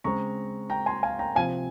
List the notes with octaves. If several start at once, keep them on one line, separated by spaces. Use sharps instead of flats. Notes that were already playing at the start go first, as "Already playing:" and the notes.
C#3 G#3 C4 A#5 C#6
G5 A#5
G#5 C6
F5 G#5
G5 A#5
C3 F3 C4 F5 G#5